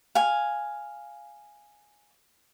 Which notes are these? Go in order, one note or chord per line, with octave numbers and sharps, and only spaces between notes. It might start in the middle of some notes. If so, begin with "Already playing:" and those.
F5 G#5